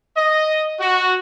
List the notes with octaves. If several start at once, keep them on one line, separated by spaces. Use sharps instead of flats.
D#5
F#4